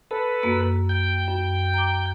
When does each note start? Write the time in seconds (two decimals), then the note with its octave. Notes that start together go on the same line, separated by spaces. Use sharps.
0.11 A4 B4
0.43 F#2 A#3
0.89 G5
1.27 F#2
1.74 A#5 D6